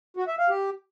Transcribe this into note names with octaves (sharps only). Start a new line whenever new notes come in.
F#4
E5
F5
G4